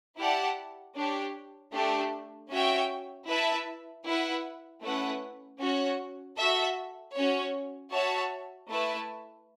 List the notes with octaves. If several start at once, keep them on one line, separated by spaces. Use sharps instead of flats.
E4 G4 D5 F#5 A5
D4 G4 C#5
A3 D4 G4
C#4 F#4 C#5 E5 G5
E4 B4 E5 A5
E4 B4 F#5
A3 C#4 E4 B4 F#5
C#4 F#4 C#5 F#5
F#4 A4 E5
C#4 F#4 C#5
F#4 C#5 E5 A5
A3 E4 B4 E5 A5